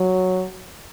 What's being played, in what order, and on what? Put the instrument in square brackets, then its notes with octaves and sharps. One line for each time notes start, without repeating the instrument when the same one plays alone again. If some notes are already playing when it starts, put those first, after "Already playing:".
Already playing: [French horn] F#3